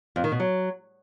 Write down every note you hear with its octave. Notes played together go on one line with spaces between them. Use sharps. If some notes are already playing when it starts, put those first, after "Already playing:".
F2
D#3
B2
F#3